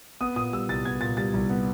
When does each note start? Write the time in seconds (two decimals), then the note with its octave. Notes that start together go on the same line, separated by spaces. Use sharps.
0.21 B3 D#6
0.36 A#2 D#6
0.53 G3 E6
0.69 C2 A6
0.85 B3 G#6
1.01 A#2 A6
1.17 G3 A6
1.34 C2
1.50 B3